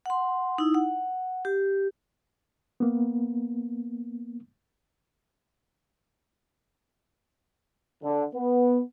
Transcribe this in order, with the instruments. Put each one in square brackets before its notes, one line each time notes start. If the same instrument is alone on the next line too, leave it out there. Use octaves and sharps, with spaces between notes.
[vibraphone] F#5 C6
D#4 E4
F#5
G4
[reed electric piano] A#3 B3
[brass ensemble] D3
B3